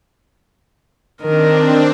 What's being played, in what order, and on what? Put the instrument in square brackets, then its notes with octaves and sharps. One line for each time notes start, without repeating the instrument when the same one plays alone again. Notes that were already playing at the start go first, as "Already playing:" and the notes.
[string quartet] D#3 D#5 [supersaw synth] C4 D4 [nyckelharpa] A#4